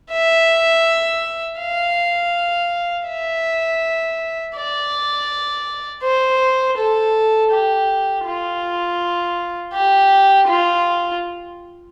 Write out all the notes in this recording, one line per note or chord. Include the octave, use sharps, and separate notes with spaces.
E5
F5
E5
D5
C5
A4
G4
F4
G4
F4